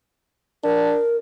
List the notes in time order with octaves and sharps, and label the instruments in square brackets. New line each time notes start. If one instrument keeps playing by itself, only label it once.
[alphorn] D4 [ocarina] A#4